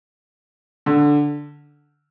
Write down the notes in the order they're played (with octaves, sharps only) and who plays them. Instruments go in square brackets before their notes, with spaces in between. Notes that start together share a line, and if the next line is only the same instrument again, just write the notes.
[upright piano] D3